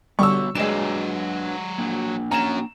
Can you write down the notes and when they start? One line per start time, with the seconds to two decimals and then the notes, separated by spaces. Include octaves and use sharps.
0.19 D3 G3 B3 F#4 C#5 C#6 E6
0.55 F#3 G#3 D4 B4 C#5 D5 E7
1.78 A#3 D4
2.31 C#4 F#4 A#5 E7